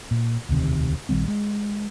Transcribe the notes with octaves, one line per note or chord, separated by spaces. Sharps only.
A#2
E1 D2 C3 D#3
A#1 D#3 G3 C4
G#3